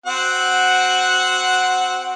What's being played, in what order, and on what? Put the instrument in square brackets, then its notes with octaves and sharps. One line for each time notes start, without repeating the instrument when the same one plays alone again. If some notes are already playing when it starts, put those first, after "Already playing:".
[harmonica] C4 F#4 F#5